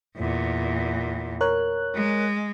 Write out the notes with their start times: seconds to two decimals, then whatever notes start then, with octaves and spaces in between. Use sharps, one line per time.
0.17 E2 A#2
1.41 A#4 C#5 F#6
1.94 G#3